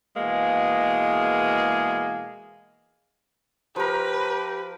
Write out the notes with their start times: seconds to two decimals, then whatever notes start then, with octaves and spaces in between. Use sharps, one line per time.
0.17 B2 E3 G#3 A#3 G#4
3.76 F3 G4 A#4 B4